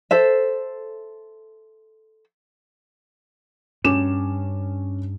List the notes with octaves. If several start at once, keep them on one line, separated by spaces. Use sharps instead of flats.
A4 C5 E5
G2 C#4 D6 E7